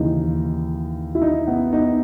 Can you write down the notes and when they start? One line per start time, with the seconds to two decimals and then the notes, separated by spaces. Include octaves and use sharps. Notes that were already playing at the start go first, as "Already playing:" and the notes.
Already playing: D#2 C#3 E3 D#4
1.15 E4
1.22 D#4
1.47 B3
1.73 D#4